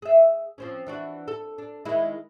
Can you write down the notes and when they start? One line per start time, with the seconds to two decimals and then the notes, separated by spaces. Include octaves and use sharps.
0.02 G#4 E5
0.58 F3 C4 C#4
0.87 E3 D4 F#4
1.28 A4
1.58 D4
1.85 D#3 G#3 E4